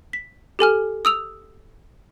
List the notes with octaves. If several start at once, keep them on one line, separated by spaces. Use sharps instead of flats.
B6
G4 A4 G#5 F6
D#6 E6 F7